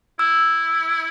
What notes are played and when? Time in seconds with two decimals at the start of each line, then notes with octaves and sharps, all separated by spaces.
0.19 E4 E6